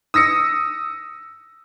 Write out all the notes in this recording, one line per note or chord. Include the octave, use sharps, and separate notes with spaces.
D#6 E6 A#6 C#7